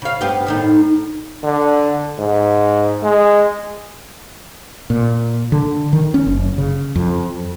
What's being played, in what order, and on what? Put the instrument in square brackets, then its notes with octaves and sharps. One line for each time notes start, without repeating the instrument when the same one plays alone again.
[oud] C#3 F5
G2 B3 G4
A2 D#3 D#4
[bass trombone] D3
G#2
G#3
[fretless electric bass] A#2
D3
D#3
C#4
F#1
C#3
F2